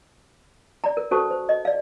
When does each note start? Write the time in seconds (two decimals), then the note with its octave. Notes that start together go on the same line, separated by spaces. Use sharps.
0.84 D5 A#5
0.97 A#4
1.11 C#4 F#4 A4 C5 A5 C#6
1.31 C5
1.49 D#5
1.65 D5 F5